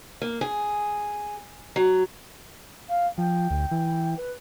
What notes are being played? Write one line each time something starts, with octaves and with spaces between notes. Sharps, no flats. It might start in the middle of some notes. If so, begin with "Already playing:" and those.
A#3
G#4
F#3
F5
F3 G5
D2
E3
B4